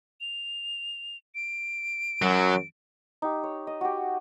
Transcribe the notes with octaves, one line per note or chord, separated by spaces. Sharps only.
F7
D7
F#2 F#3
D#4 G4
C#5
D#5
F#4 G4